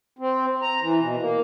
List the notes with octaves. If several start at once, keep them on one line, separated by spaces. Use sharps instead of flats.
C4
A#5
E3
B2
A#3